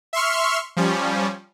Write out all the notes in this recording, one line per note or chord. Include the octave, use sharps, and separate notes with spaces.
E5 C6 C#6 F6
F3 G3 C#4